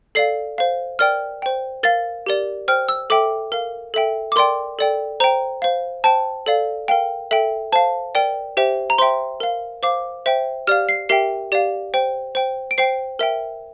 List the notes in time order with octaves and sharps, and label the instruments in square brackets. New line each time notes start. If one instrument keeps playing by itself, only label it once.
[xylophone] A4 D5 F5 C7
C5 F5
A#4 D5 G5 F6
C5 G5
A#4 F5 A6
G4 A#4 D5
C5 G5 F6
E6
A4 E5 G5 D6
A#4 F5
A4 E5 G5
D6
A#4 D5 G5 C6
A4 D5 G5
C5 G5 A#5
C5 F5
C5 G5 A5
A4 D5 F5
A#4 F5 G5
A4 E5 G5
C5 F5 A5
A#4 D5 G5
G4 C5 E5 G5
A#5
C5 E5 G5 C6
A#4 F5
C5 F5 D6
C5 E5 G5
G4 D5 F5 F6
C7
G4 A#4 E5 G5 C7
G4 D5 F5
C5 G5
C5 G5
D7
C5 G5 C7
A#4 E5 G5